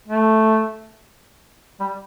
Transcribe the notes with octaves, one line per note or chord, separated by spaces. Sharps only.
A3
G3